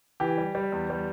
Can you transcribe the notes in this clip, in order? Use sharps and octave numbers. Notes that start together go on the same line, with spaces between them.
E3 G4
G3
G3
E2
G3